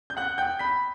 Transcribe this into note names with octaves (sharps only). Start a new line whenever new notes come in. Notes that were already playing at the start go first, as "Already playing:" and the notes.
G6
F#5 F#6
G5 G6
B5 B6